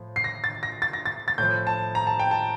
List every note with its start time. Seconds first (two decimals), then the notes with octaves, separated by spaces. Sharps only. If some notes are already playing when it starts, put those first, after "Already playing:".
Already playing: A2 F3
0.16 C7
0.24 A#6
0.44 A6
0.63 A#6
0.82 A6
0.93 A#6
1.06 A6
1.28 A6
1.38 A2 F3 G6
1.67 A5
1.95 A#5
2.07 A5
2.19 G5
2.31 A5